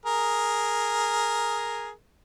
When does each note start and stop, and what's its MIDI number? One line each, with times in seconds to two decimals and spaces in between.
0.06 1.91 68
0.06 1.91 70